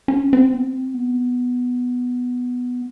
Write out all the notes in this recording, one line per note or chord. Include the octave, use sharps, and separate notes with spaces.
C#4
C4
B3
C4
B3